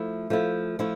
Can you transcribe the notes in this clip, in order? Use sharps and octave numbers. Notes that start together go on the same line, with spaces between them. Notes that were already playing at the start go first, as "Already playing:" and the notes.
Already playing: F3 A3 E4
F3 A3 E4
F3 A3 E4